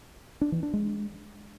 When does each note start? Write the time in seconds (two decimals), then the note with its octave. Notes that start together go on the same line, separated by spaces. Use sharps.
0.41 D4
0.52 E3
0.63 D4
0.73 G#3